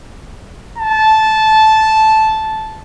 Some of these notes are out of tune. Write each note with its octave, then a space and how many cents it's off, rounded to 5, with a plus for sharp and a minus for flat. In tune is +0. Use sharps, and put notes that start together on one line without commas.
A5 -10